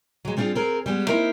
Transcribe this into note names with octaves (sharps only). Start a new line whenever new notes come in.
F#3 G#3
G3 C4 D4 F4 G#4
C4 G#4 A#4
G3 G#3 B3
A#3 C4 D#4 E4 A#4 C5